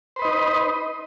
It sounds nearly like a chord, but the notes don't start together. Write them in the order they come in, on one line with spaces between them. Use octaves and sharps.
C5 B4 D#5 D#4